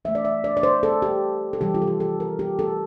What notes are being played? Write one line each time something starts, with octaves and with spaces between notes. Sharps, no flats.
E3 A3 E5
D5
E5
D5
D5
C5
A4
G4
A4
C3 E3 G3 G4
F4
A4
G4
A4
A#4
G4
A4